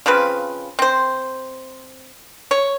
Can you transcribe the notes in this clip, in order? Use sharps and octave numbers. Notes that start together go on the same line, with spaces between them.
C#3 F3 C4 B4
C4 C5
C#5